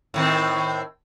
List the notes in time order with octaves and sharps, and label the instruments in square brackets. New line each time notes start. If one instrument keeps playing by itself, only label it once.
[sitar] A2 D#3 C4